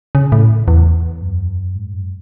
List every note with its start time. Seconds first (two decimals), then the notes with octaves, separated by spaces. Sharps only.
0.15 C#3
0.32 A2
0.68 E2
1.22 F#2
1.76 G#2
1.94 F#2